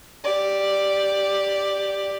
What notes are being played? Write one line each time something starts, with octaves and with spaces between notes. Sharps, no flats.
G4 D5